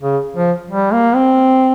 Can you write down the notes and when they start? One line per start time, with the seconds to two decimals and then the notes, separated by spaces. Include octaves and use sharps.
0.02 C#3
0.37 F3
0.70 G3
0.93 A#3
1.15 C4